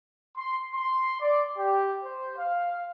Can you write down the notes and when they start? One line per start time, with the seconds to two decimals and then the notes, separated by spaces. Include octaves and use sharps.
0.37 C6
0.73 C6
1.21 D5
1.58 G4
2.04 C5
2.37 F5